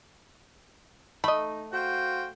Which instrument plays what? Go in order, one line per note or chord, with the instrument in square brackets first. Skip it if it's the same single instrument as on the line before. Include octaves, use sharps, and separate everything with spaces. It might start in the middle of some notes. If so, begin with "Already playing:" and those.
[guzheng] A3 [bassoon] D#4 [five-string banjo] D#5 B5
[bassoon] F#4 [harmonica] C5 F5 G5